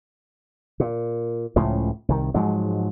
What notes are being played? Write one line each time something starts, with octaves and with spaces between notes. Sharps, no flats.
A#2
C#2 A2 C#3 F3
C2 D#3
G#2 F3 F#3 G#3